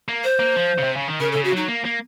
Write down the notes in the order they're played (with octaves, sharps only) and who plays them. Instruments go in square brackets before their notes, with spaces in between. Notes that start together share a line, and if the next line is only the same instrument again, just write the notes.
[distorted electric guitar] A#3
[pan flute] C5
[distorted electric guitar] A#3
F3
C#3
C3
C#3
D#3
[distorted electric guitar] C#3 [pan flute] A#4
[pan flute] A4
[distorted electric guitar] C#3
[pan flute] F#4
[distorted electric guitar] F#3 [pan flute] D#4
[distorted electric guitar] A#3
A#3